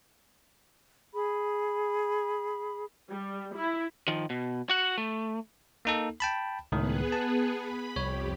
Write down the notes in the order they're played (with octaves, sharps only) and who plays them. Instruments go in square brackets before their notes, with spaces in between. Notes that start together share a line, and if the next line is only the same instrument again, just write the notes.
[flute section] G#4 B5
[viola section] G3
E4
[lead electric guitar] D#3 F3
B2
F#4 F#5
A3
[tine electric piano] A#3 D#4 A4
G5 A5 B5
[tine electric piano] C#2 A2 D#3 [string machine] B3 G#4 B4
[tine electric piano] A5
[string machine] B5
[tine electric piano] C2 C#5 [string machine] F2 G4